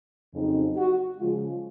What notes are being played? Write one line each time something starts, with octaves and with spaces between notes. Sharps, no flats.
F2 C#3 F#3 C4 D#4
F#4
C#3 F3 G#3 F4